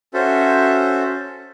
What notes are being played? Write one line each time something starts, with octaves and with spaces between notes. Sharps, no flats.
C#4 F#4 A4 C5 E5